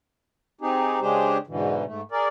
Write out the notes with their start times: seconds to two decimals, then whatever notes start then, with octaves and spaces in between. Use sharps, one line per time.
0.61 C4 D#4 G4 G#4
1.01 C#3 G#3 D4 G4 G#4 C5
1.47 E2 G#2 B2 D3 E3
1.85 G#2 A3
2.11 G#4 A#4 D5